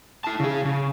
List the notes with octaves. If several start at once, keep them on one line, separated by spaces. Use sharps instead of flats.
E4 A5
C#3 G#4
C#3